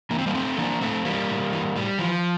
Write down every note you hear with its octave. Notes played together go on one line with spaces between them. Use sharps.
E3 A#3
C4
G3 A#3
A2 A3 C4
E3 A#3 D4
A2 A3 C4
E3 G3 A#3
A2
E3
A2 G3
E3 F3